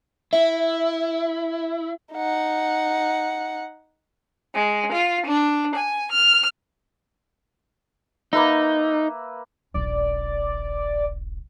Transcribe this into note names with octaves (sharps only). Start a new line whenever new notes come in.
E4 E5
D#4 F#5
G#3
F4
D4
G#5
F6
A#3 D#4 B4 E5
D#1 A#1 D5